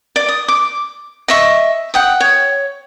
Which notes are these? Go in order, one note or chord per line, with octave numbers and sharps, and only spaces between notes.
D5
D#6
D6
D#5 E5 C#6
F#5 G5 D#6
C#5